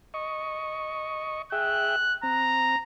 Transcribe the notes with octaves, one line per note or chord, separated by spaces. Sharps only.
D#5 C#6
G#4 E5 G5 F#6
C4 A#5